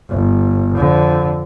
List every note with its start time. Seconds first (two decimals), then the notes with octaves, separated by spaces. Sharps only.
0.10 G1
0.76 F2 D3